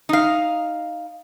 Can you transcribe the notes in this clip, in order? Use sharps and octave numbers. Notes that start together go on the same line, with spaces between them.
D#4 F5